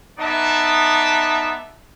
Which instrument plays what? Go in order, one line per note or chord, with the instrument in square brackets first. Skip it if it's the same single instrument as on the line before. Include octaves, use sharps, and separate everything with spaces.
[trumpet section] B3 D#4 D5 E5 A5